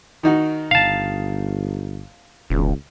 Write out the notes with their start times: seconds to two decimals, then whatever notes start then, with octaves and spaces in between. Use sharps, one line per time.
0.23 D#3 D#4 F#4
0.71 G1 F5 A5
2.50 E1 C#2